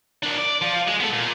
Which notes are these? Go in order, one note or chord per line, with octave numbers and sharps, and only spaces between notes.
A#3 D4
D5
F3 F4
G#3
B3 A4
A#2